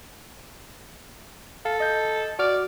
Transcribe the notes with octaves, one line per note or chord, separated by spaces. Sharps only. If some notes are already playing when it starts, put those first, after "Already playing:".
A4 F5
D#5 G6
F#4 D5 D6 F6